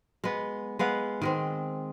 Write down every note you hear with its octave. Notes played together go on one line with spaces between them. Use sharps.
G#3 B3
G#3 B3 F5 F#5
D#3 G#3 C4